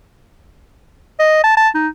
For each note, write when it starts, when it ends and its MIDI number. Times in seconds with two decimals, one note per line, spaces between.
1.20 1.41 75
1.44 1.55 81
1.57 1.69 81
1.75 1.88 63